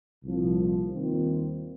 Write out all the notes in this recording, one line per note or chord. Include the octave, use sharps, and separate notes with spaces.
C2 A#2 F3
D#2 D#3 G3 C4 F4